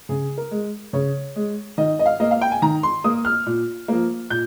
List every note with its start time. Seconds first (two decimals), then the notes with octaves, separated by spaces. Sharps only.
0.09 C#3 G#4
0.38 A#4
0.51 G#3
0.93 C#3 C#5
1.36 G#3
1.78 D#3 D#5
1.99 D#5
2.06 F5
2.20 A#3 D#5
2.31 F5
2.41 G5
2.51 G#5
2.62 D#3 A#5
2.83 C6
3.04 A#3 D#6
3.25 F6
3.46 A#2
3.88 F3 A#3
4.30 A#2 G6